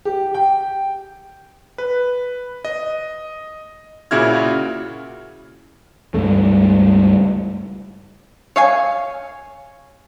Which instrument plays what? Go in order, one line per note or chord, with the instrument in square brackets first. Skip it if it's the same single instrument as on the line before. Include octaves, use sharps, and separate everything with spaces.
[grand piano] G4
G5
[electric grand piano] B4
D#5
A#2 C#3 E4 F#4 F6 G#6
[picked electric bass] C#2 G2 A3
[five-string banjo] C#5 F5 G#5